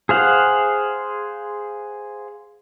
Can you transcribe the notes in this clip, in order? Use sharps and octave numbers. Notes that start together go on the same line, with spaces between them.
G#4 C5 F5 F#5